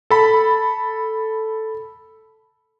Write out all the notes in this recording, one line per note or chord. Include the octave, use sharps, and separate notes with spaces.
A4 B5